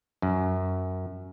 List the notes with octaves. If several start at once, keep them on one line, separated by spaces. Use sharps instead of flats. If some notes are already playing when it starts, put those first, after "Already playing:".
F#2